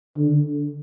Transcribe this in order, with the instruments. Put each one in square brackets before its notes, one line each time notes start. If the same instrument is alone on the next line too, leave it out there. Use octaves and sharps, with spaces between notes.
[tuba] D3